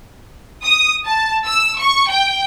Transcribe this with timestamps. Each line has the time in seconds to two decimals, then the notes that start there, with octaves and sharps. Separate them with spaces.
0.64 D#6
1.05 A5
1.46 E6
1.81 C#6
2.10 G5